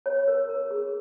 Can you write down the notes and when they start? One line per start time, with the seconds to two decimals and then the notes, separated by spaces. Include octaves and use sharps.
0.06 C#5
0.16 C#5
0.28 A#4
0.49 A#4
0.71 G#4